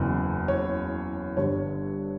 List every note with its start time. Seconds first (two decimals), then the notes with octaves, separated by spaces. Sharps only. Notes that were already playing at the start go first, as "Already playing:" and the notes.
Already playing: F#1 E2 C#3
0.48 C#5
1.37 G1 G2 D3 C#5